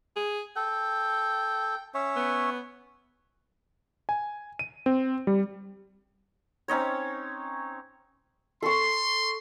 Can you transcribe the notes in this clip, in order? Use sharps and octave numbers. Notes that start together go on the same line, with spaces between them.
G#4
A4 G5
C#4 C#5 E5
B3
G#5
D#7
C4
G3
C4 C#4 D#4 C#5
A4 C6 C#6